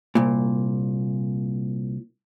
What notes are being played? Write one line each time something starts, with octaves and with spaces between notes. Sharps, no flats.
C2 A#2